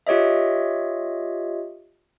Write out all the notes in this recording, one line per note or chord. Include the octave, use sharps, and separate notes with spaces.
F4 G4 C#5 D#5 E5